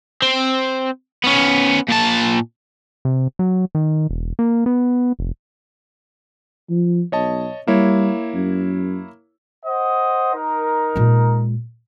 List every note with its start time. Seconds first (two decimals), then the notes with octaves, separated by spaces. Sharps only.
0.22 C4
1.24 B3 C#4
1.89 A#2 A5
3.05 C3
3.39 F#3
3.75 D#3
4.09 E1
4.39 A#3
4.66 B3
5.19 F1
6.70 F3
7.12 B1 C#5 D#5 A5
7.67 G3 A#3 E4 C#5
8.34 F#2
9.66 C5 D#5 F#5
10.35 D#4 A#4
10.96 A#2 G#3